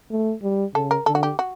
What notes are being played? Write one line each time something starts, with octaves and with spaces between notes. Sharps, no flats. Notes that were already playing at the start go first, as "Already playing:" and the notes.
A3
G3
C#3 A4
A#4
D3 A4
F#4
G4
F#4